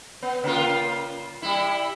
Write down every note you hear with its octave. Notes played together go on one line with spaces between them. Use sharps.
B3
C#3 A#3 F4
G3 E4